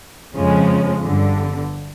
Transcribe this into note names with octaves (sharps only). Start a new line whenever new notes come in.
F2 C#3 F3 G#3 C#4
G1 G2 D3